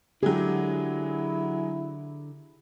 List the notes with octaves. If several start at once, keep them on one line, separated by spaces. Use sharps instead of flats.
D3 F#3 G#3 E4 G4 G#4